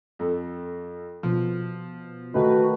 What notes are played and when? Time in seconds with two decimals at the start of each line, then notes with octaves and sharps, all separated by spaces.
0.19 F2 A4
1.23 B2 F3
2.34 D#3 A3 D#4 F#4 B4